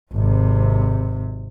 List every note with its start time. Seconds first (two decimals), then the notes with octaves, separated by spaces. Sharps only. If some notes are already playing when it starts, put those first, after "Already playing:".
0.13 G#1 C3